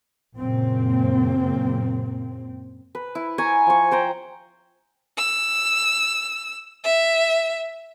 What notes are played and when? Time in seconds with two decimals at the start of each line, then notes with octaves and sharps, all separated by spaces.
0.38 F#2 A#2 C#3 A#3 C4
2.95 B4
3.15 E4
3.38 G#5 A#5 C#6
3.67 F3 C#6
3.91 C5 G5 A#5
5.18 E6
6.84 E5